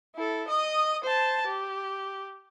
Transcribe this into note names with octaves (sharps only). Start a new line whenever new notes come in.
E4 A4
D#5 D#6
C5 A5
G4